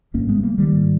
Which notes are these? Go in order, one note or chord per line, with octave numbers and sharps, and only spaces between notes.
G#1 G2 A#3 C#4
G#3 B3
G3 A#3
D#3 G3
G#2